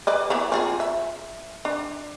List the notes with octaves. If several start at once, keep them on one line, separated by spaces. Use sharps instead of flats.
B4 D5 D#5
A#3 B3 E4
C4 F4 G#4
E5
D4